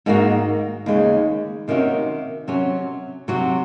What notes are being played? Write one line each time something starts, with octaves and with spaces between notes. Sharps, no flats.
G#2 D#3 A#3 D#4 F#4
D#2 C#3 G#3
C3 D#3 A#3 C#4 F#4
C3 F#3 C#4
C3 F#3 C4 F#4